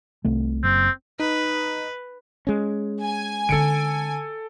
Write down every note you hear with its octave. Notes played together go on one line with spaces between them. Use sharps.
C2 C3 A3
F#1 C4
D#4 B4
G#3 C#4
G#5
D3 C4 A4 C#7 D7